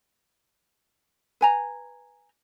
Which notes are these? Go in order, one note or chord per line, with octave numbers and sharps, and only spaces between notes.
B4 G#5 A#5